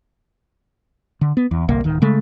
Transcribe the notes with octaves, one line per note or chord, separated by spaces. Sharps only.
D3
B3
E2
G1 C2 C3 A#3
D1 D#3
C#3 G#3 A3